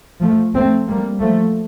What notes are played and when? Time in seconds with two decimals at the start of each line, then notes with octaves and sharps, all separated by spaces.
0.22 F3 A3
0.55 A3 C4
0.88 G3 A#3
1.21 F3 A3